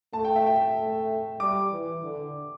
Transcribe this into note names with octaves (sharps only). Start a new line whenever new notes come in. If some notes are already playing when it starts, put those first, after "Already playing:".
A3 A5
G5
E5
G5
A3
G3 D6
E3
D3